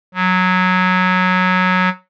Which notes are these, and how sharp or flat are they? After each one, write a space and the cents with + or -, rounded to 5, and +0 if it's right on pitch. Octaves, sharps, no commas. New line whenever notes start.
F#3 -10